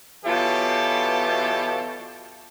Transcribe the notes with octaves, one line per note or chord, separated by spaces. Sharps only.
B2 E3 F#3 F4 G4 A4